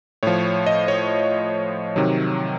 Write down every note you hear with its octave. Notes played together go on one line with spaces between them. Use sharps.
A2 F3 C#5
D#5
C#5
C3 D#3 F#3